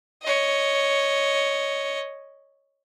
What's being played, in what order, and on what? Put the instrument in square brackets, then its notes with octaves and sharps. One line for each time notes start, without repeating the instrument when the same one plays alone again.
[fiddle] C#5 D#5